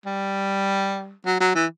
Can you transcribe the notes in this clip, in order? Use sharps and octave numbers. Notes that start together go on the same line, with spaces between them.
G3
F#3
F#3
E3